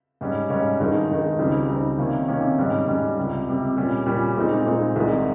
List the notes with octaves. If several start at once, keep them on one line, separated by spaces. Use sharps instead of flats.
G#2 G3 C#4
G#2 G3 C#4
G2 D#3 G#3 D#4
G2 D#3 G#3 D#4
C#2 C#3 G3 C4 D#4
C#2 C#3 G3 C4 D#4
C3 D#3 A#3 C#4
C3 D#3 A#3 C#4
G#2 G3 C#4
G#2 G3 C#4
C#2 C3 G3
C#2 C3 G3
A#2 G3 C#4
A#2 G3 C#4
A#2 G#3 C4 D#4
A#2 G#3 C4 D#4
C2 C3 D#3 G#3